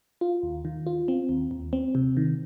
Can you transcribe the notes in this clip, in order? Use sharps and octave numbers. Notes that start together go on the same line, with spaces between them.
F4
D#2
D#3
F4
C4
D#2
D#2
C4
C3
D#3